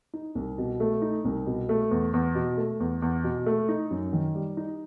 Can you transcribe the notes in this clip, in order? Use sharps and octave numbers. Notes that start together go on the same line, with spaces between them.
D#4
C2
B2
A3
D#4
C2
B2
A3
E2
E2
B2
A3
E2
E2
B2
A3
D#4
F#2
D#3
G3
D#4